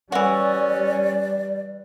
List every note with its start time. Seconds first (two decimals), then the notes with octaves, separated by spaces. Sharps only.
0.12 E3 G3 C#4 F#4 D5